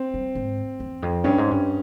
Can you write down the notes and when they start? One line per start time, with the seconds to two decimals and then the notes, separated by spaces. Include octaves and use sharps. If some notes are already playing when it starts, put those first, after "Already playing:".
Already playing: C4
0.14 G3
0.35 G#2
0.80 E2
1.02 F2
1.24 G2 C#4
1.38 G#2
1.51 G2